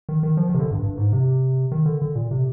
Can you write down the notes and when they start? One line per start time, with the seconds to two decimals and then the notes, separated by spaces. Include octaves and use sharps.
0.09 D#3
0.23 D#3
0.37 F3
0.49 D#3
0.54 C3
0.60 D3
0.71 G2
0.83 G2
0.97 G#2
1.12 C3
1.72 D#3
1.86 D3
2.02 D3
2.15 A#2
2.31 C3